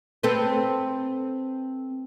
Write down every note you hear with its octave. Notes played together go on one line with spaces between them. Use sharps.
C4 A4 B4